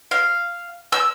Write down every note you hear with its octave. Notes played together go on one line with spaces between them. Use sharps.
F5
E6